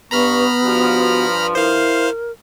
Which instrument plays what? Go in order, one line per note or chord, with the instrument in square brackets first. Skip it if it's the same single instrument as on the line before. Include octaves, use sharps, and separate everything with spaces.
[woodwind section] G2 C#6 [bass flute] B3 [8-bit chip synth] A#5 B5 F6
[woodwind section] G2 F3 [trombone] F#4
[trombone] E4 [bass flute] A#4 [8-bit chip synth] C5 F5